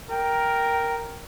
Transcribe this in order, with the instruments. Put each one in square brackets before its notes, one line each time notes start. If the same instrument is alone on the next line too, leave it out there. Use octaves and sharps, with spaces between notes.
[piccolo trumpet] A#4 [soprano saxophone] G5